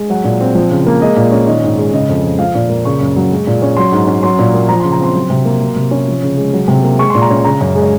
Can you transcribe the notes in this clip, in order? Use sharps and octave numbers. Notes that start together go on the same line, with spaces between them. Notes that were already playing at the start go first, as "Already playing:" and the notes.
Already playing: G#3
F#3 F#5
A#2
C4
F3
C#3
A#3
G#3 D#5
A#2
C#4
D#3 D#5
G#2
G#3
C#3 D#5
F2
F3
F3 F5
A#2
A#3
C#3 C#6
F#2
F#3
G#3
A#2
C#4
F#3 C6
G#2
C#4
F#3 C6
A#2
A#3
F3 A#5
C6
C#3
A#5
C4 C6
F#3
C3
A#3
F#3
C3
C#4
F3
C#3
G#3
F#3
C3
A#3
G#3 C#6
C6
A#2
A#5
C#4
C#3 A#5
F#2
G#3
C#5